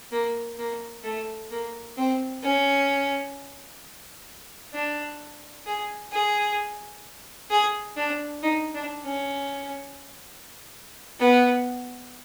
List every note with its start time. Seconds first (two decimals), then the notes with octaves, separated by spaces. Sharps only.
0.12 A#3
0.58 A#3
1.04 A3
1.51 A#3
1.97 C4
2.43 C#4
4.73 D4
5.66 G#4
6.12 G#4
7.51 G#4
7.97 D4
8.43 D#4
8.74 D4
9.04 C#4
11.20 B3